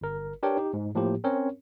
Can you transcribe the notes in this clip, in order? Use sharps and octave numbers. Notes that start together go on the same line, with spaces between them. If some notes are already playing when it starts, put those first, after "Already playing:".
G1 A#4
D4 G4 A#4 B4 C#5 G5
D#4 G4
G#2
A2 F3 A#3 G4
C4 C#4 A#4 C#5